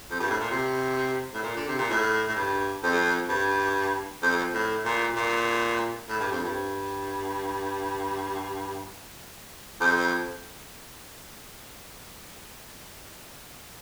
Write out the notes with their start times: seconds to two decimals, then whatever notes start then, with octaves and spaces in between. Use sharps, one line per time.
0.10 F2
0.20 G2
0.30 A2
0.39 A#2
0.50 C3
1.33 A2
1.43 A#2
1.56 D3
1.67 C3
1.78 A#2
1.90 A2
2.28 A2
2.35 G2
2.83 F2
3.29 G2
4.22 F2
4.54 A2
4.85 A#2
5.15 A#2
6.09 A2
6.20 G2
6.32 F2
6.44 G2
9.80 F2